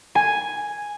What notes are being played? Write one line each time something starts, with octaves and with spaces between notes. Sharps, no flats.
G#5